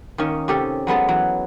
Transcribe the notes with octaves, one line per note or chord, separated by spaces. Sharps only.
D#3 A#3 C#4 D#5
C3 C#4 G4 A4
F#3 G#3 B3 A4
E3 F#3